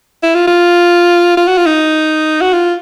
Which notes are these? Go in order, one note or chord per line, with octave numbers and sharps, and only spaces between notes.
E4
F4
F4
F4
F#4
F4
D#4
F#4
F4